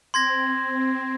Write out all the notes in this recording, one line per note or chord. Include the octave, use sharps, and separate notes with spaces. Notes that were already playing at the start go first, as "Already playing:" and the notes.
C4 C6 G#6 A#6